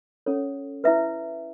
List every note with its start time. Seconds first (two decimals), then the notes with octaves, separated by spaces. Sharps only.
0.26 C#4 A4 C#5
0.84 E4 B4 E5